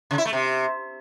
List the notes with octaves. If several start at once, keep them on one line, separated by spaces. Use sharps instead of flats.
C#3
E4
A3
C3